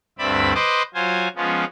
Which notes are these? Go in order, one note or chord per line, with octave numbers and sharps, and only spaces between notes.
D2 G2 C4 D5 E5 B5
B4 C5 D#5 C6 D6
F#3 F4 C5 G#5
F3 G#3 B3 C#4 F4